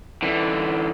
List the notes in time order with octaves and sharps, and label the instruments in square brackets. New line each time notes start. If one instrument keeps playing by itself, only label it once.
[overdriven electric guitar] D3 E3